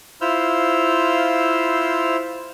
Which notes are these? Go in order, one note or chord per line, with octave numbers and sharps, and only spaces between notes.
E4 F4 C5 E6 F6 G6